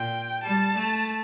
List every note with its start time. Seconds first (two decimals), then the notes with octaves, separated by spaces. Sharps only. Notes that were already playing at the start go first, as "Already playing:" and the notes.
Already playing: A#2 G5
0.43 G3 A5
0.77 A3